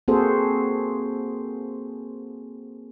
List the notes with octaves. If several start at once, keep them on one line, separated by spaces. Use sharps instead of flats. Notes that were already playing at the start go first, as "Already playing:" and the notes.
A#3 C4 F#4 G#4 A4 C5